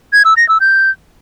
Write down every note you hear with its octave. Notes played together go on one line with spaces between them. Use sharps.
G#6
E6
A#6
E6
G6